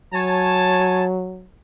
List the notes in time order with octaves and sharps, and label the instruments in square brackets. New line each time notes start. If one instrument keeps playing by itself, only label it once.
[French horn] F#3 [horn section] C#5 G#5 A5